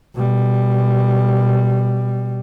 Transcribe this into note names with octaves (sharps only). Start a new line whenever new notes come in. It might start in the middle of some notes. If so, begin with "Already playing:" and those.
B2 G3